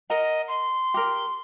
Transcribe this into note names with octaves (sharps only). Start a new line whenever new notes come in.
A#4 D#5 F#5
C6
G4 A#4